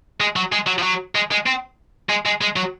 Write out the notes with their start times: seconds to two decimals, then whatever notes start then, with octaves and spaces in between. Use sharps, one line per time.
0.20 G#3
0.36 F#3
0.52 G#3
0.67 F#3
0.79 F3
0.83 F#3
1.15 G#3
1.31 G#3
1.46 C4
2.10 G#3
2.26 G#3
2.41 G#3
2.56 F#3